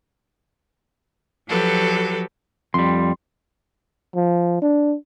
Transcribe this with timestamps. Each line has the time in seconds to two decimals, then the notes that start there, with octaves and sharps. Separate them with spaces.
1.48 F3 F#3 F#4 G4 A4 B4
2.74 F2 G3 C6
4.15 F3
4.62 D4